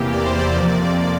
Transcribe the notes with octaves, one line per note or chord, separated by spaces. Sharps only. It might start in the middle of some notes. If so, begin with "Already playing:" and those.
Already playing: E2 C3 E3 A#3 G4
D5
C5
D5
F2 C3 F3 A#3